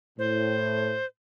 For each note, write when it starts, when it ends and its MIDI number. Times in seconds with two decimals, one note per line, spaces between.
0.19 0.98 45
0.19 1.05 72